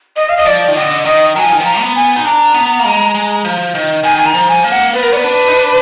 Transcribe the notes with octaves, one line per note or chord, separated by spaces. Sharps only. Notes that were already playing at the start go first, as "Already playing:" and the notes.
D#5
F5
D#5
F3 D5
D#3
D3 D#5
D#3 D#5
F#3 A#5
F3 G#5
D#3
F3 A#5
B3
G#5
D#4
D4 A#5
B3
A#3
G#3
G#3
F3
D#3
D#3 G#5
G#5
A#5
F3
G#5
A#3
F#5
B3 B4
A#4
B3 B4 D5
D4
D#4
D4